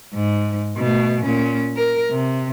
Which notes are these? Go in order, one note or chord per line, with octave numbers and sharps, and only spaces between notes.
G#2
B2 A3
A#2 C#4
A#4
C3